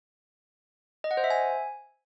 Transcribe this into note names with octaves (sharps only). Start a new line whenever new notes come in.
D#5
F#5
C5
E5
G#5